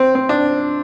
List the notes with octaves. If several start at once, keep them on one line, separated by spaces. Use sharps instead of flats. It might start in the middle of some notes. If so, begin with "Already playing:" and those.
Already playing: C4
C4
D4